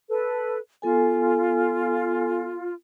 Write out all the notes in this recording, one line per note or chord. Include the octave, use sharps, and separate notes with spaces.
A4 B4
B3 F4 A4 G#5